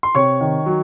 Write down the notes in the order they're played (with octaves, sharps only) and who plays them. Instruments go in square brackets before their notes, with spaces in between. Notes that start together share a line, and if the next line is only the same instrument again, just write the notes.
[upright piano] C6
C3 C#5 C#6
D#3
F#3